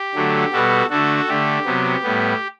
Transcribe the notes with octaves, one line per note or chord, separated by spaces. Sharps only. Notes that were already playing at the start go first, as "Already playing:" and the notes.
Already playing: G4
D3 F#3 A3
B2 G3 B3 F#4 A4
D3 A3 F#4 A4
D3 A3 G4
C3 F#3 B3
A2 G3 B3